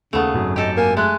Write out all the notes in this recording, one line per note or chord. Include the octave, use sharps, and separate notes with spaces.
D#2 C#3 A3 B3 G#4
G#1 F#2
G4 A4 D#5
A#3 G#5
G#3 A3 F#6